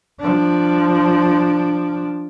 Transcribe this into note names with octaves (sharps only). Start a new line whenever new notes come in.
F3 D4